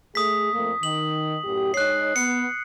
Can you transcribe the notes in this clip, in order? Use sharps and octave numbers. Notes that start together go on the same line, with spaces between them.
A3 G#4 D#6 B6
F2 A3 A#3
D#3 F#7
F#2 A2 G4
G#3 D#4 C#5 F#6 C7
B3 C#7